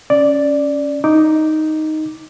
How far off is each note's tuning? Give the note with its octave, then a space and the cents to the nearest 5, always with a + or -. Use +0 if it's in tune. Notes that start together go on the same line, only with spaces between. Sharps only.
C#4 +0 D5 +0
D#4 +0 D6 +0